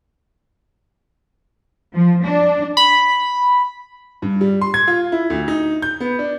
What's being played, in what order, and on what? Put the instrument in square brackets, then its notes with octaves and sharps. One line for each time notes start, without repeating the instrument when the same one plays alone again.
[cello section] F3
D4
[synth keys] B5
[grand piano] G2
G3
C6
G#6
F4
E4
D2
D#4
G6
B3
D4